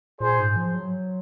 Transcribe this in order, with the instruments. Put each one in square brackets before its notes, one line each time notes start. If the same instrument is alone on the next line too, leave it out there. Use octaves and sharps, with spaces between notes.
[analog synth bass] A#2 [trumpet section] G#4 C5
[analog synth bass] G#2
F3
F#3